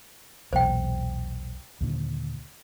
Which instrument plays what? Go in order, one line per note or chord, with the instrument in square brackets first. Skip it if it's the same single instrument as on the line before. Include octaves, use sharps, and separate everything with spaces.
[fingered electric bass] B1 E2 A#2 [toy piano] C5 G5
[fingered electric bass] D#2 A#2 D3